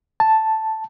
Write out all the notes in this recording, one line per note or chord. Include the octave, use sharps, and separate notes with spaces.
A5